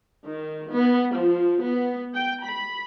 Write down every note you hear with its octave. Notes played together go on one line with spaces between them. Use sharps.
D#3
B3
F3
B3
G5
B5